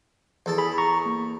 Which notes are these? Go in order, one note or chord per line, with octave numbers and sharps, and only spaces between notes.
E2 A4 A5
G#4 B5
A#5 C#6
A#3